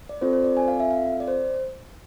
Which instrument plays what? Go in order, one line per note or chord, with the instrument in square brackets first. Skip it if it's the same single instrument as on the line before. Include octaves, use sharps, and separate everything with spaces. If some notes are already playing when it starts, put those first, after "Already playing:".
[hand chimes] D5
C4 F4 A4 C5
C5
D5
G#5
F5
E5
F5
D5
C5